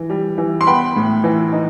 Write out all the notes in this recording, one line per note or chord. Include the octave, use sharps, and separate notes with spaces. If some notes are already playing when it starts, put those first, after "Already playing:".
Already playing: E3
G3
E3
C6
B3 G5 B5
A2
E3
D#4